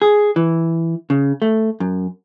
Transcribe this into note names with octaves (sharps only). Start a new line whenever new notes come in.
G#4
E3
C#3
A3
F#2